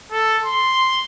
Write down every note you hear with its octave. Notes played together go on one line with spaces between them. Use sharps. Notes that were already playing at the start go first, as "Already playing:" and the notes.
A4
C6